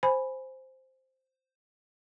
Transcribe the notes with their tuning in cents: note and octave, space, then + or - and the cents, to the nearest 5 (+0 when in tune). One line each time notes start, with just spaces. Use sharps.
C5 +0 G#5 +0 B5 +0